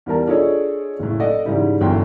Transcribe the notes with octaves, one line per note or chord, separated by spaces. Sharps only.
E2 G3 A#4 A5
D4 F4 G#4 A4 C#5 D#5
F#1 A2
A4 D5 D#5 F#5
G#2 C#3 E3 G3 E4
G1 F#2 E3 G5 C6